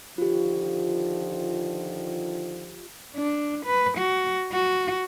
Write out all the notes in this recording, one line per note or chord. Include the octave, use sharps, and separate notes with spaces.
D3 D#3 F3 F4 G4
D4
B4
F#4
F#4